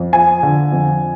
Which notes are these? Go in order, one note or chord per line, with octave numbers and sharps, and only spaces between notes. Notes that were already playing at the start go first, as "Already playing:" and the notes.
Already playing: F2
F3 G#5
D3
F2